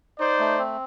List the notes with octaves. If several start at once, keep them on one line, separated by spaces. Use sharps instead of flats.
D#4 C5 D5
A3
C4